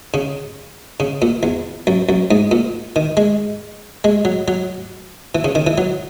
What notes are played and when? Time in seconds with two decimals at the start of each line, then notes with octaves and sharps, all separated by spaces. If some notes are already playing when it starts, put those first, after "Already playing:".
0.14 C#3
1.00 C#3
1.22 A#2
1.43 E2
1.87 F#2
2.09 F#2
2.31 G#2
2.51 A#2
2.96 D#3
3.17 G#3
4.04 G#3
4.25 F#3
4.48 F#3
5.35 E3
5.44 C#3
5.55 D#3
5.67 E3
5.78 F#3